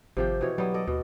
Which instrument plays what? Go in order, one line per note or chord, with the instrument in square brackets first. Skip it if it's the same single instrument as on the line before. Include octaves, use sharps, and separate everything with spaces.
[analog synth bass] G#1 [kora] C3 F3 G4
[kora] B2 E3 C#5
[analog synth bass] F#3 [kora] G3 B3
[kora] A4 D5 D#5
[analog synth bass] D#2 [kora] B2 B3